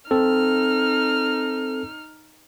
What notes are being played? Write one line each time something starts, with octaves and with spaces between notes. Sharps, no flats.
C4 D#4 A4 F6